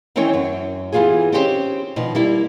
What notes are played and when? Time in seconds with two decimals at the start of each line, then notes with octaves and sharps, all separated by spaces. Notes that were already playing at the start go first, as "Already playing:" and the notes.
0.16 D#3 E3 C4 C#4 C#5 G5
0.34 F#2
0.92 E3 B3 F4 G4 G#4
1.32 C4 C#4 D#4 G4 B4 C5
1.96 B2 D#3 F3
2.15 G3 A#3 E4